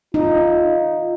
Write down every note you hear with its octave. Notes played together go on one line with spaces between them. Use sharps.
D#4 F4